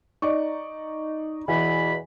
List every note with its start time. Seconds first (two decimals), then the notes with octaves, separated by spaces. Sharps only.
0.22 D#4 D5 D#5 C#6
1.48 E2 B2 E3 B5